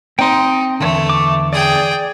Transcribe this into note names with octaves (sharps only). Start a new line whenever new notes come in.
C4 D#4 G5 C6
E2 G2 D3 A3
D6
G#4 D5 G5